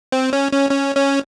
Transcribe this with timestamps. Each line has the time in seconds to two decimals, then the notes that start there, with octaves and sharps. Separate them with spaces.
0.12 C4
0.33 C#4
0.52 C#4
0.71 C#4
0.96 C#4